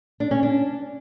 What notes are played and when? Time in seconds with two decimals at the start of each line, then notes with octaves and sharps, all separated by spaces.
0.20 D4
0.31 C#4
0.43 D4